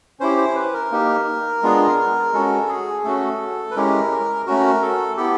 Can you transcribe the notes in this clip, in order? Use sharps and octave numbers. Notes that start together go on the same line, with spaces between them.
C#4 E4 G4 C5
C5
B4
A#4
A#3 D#4 G4
G#3 B3 D4 F4 G#4
G#3 C#4 F#4 A4
G#4
A3 C#4 F#4 A4
B4
G#3 C#4 E4 G4 A#4
A3 C#4 F#4 A#4
A4
B3 E4 G4 A4